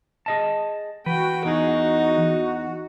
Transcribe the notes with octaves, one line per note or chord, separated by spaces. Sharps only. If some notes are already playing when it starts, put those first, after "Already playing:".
G#4 D#5 A5
E3 F#4 B4 G5
E2 D#4 G#4